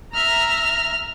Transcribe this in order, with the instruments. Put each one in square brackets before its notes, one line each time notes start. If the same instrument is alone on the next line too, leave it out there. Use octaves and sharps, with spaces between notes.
[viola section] E5 A#5 [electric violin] F6